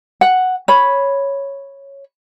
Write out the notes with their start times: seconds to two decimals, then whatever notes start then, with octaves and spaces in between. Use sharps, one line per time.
0.21 F#5
0.68 C#5 B5